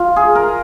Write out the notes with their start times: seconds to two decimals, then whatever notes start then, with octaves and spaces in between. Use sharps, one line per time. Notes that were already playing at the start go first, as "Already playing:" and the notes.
Already playing: F4
0.16 G#4
0.35 A#4